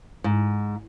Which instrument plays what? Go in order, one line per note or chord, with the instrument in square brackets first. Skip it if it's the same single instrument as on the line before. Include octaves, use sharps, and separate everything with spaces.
[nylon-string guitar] G#2